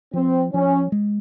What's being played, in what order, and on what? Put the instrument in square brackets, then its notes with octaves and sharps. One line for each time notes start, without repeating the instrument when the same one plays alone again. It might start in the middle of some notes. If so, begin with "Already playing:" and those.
[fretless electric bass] F3 [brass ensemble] C4
[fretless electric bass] F3 [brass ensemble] C#4
[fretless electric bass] G#3